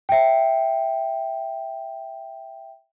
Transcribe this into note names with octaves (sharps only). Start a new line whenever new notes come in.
E5 G5